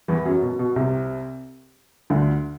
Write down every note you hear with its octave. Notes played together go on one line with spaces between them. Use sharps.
E2 E3
F#2 F#3
B2
B2
C2 C3
D2 D3